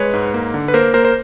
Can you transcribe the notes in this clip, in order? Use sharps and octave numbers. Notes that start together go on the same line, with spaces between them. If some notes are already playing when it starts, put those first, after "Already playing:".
Already playing: G#3 B4 C#5
G#2
A#3
D3
B4
A#3 A#4 C5
A#3 A#4 C5
C5